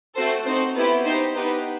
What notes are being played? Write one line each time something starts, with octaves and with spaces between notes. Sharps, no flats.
A3 C4 F#4 A4 C5
C4 D#4 F#4 C5
B3 E4 G4 B4
D#4 G4 C5
B3 D#4 G4 B4